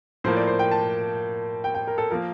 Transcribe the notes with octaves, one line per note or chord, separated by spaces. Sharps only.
A2 F3 A#3 C5
D5
C5
G5
A5
G5
G5
A#4
A4
F3 A#3 A#4